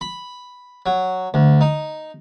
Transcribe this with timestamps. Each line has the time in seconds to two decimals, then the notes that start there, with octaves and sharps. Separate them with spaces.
0.01 B5
0.86 F#3
1.34 D2
1.61 D#4